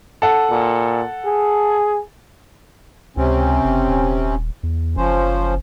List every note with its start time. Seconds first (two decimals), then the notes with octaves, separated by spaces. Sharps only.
0.22 A4 F#5
0.51 A#2
1.25 G#4
3.17 C#2 C3 C4 C#4
3.64 F#1
3.89 D#1
4.63 E2
4.97 F#1 F3 C#4 C5